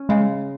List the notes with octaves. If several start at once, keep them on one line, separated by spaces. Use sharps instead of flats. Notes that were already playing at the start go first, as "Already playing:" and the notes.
Already playing: C#4
C#3 G#3